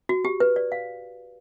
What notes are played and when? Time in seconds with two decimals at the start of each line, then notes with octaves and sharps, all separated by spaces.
0.09 F#4
0.25 G4
0.40 B4
0.56 D5
0.72 F5